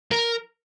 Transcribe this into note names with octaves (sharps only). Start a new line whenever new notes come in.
A#4